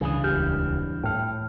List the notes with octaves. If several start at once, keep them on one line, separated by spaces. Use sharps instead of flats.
C#2 G2 C#3 E3 D4 D#6
D#1 C#2 G4 F6 G6
A2 G5 F6